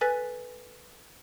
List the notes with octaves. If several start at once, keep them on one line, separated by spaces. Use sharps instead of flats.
A4 B4 G#5 F#6 A6 B6